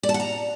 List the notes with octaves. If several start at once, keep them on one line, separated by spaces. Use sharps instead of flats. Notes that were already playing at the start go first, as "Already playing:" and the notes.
D5
A5
F#5
A#5